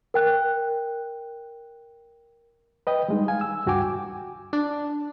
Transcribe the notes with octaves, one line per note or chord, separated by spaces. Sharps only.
A#4 G5 F#6
B4 D#5 G5
G3 G#3 D#4
F5 G#5
E6
C#2 G2 F#4 G5 G#5 D6
D4